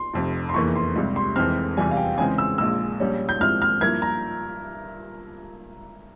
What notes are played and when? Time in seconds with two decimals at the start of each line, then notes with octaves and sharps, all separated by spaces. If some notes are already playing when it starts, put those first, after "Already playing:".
Already playing: C6
0.14 F1 F2 C3
0.49 C6
0.54 F1 E2 E3 A#3 C#6
0.75 C6
0.96 C#2 C3 G3
1.16 C6
1.36 F1 F2 E3 G#3 C4 F6
1.77 E2 C3 E3 G3 G#5
1.91 F5
1.97 G5
2.17 C#3 E3 G#3 C4 G#5
2.38 E6
2.58 A#1 A#2 G#3 E6
3.00 A#1 A#2 G3 C#4
3.29 G6
3.40 G#2 F3 C4 E4 G4 F6
3.62 F6
3.81 G2 F3 A#3 E4 A#4 G#6
4.02 A#5